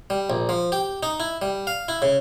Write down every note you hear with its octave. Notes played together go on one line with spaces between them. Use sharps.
G3
A#1
F3
G4
D#4
E4
G3
F5
E4
C#3